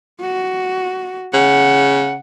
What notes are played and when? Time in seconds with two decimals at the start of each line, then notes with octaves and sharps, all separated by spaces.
0.21 F#4
1.34 C#3 F#5